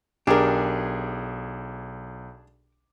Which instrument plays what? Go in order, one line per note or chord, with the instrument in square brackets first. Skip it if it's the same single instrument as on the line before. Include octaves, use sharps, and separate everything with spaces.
[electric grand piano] B1 D6 [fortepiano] D4 G#4 [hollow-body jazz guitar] G4 A#4